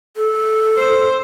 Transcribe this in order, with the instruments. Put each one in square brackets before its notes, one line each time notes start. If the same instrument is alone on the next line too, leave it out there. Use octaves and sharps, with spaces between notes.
[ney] A4
[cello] C5